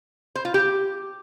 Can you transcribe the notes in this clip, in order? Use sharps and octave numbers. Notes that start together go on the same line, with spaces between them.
C5
F4
G4